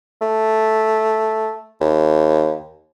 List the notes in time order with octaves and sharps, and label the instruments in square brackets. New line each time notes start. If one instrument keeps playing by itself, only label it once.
[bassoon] A3
D#2